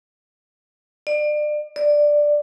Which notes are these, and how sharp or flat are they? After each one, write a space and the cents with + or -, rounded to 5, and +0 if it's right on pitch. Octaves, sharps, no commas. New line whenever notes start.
D5 +30
D5 +5